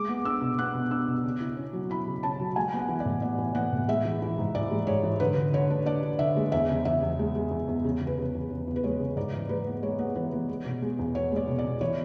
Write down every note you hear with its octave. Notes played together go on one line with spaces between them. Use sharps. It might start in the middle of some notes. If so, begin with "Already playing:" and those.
Already playing: G#3 D6
B3
D4 E6
B2
B3 F#6
B2
D4 E6
B2
C#3
E4
C#4
F#3
E4 B5
C#3
C#4 A5
F#3
G#3 G#5
B3
F#5
E3
D5
A2
B3 D5
E3
B3 F#5
A2
G#3 E5
E3
E3
G#2
E3 D5
G#3
G#2 C#5
E3
D3 B4
D3
D3 C#5
D4
D4 D5
D4
D3 E5
G#3
E2 E5
C#3
E2 E5
E2
G#3
G#3
E2
E2
C#3
E2
B4
C#3
E2
C#3
E2
B4
G#3 C#5
C#3
G#2 D5
E3
G#3 B4
B3
G#3 C#5
B3
E3 B4
B3
G#3
B2
G#3
E2
B3 C#5
G#3 D5
B2
D5
B2
E3 C#5